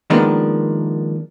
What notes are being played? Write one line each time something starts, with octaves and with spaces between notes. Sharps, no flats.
D#3 F3 G#3 A#3 B3 D4